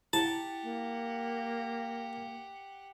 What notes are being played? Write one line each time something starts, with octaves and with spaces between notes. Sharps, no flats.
E4 G4 F#5 A5
A#3